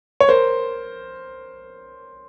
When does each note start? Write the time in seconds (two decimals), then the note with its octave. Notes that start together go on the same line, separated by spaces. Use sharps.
0.20 C#5
0.29 A#4 C5